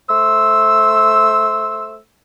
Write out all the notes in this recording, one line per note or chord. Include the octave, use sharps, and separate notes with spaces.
A3 C5 E6